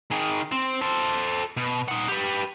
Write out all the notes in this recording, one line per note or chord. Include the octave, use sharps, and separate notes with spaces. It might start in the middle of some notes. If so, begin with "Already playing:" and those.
D#3 G#4
C4
A4 C5
B2
D#4 F#5
G4 B4